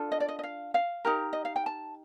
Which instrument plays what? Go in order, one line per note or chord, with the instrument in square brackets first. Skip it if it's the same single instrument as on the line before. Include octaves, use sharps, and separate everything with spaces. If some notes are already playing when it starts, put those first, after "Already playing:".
Already playing: [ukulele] D4 F4 A4
D#5
D5
D#5
D#5
F5
F5
D#4 G4 A#4
D#5
F5
G5
A5